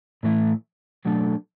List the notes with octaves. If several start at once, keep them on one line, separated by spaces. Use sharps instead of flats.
A2 E3 A3 E4
B2 F#3 A3 D4 A4